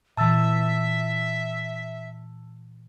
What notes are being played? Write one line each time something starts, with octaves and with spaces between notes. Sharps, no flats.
A#2 E3 E5 A5 E6 A6